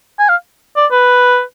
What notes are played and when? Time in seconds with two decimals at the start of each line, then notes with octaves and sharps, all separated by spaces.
0.19 G#5
0.29 F5
0.76 D5
0.91 B4